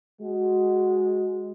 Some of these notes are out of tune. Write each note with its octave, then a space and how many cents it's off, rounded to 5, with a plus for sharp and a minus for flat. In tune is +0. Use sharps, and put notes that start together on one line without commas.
G#3 +0 F#4 +0